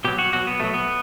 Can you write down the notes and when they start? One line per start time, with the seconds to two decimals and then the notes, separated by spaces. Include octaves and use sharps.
0.05 B2 F#3 G4
0.19 F#4
0.33 B2 F#3 F#4
0.47 B3
0.60 B2 F#3 A3
0.74 B3